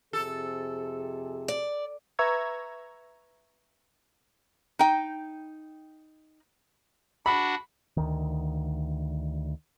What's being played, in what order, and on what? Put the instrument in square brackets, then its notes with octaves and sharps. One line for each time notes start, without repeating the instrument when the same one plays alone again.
[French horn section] F2 C3 G#4 [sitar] A4
[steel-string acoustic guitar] D5
[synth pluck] B4 E5 A#5 C#6 E6 G#6
[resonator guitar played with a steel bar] D#4 G5
[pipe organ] D4 F#4 F#5 [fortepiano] B5
[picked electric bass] D2 D#3